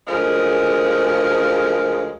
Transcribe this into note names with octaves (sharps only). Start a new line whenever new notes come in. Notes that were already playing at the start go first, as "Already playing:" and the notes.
D2 C#3 F3 G#3 G#4 A#4